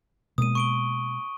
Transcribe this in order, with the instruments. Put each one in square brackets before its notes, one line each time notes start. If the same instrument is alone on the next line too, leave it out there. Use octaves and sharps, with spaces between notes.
[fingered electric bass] B2 G#3 A#3 [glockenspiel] D#6 D#7
[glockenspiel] C#6 D7 G7